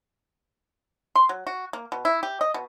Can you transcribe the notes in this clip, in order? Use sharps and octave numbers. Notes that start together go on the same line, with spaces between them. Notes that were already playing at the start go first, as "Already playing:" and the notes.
C6
F#3
F#4
A#3
B2
E4
G4
D#5
B2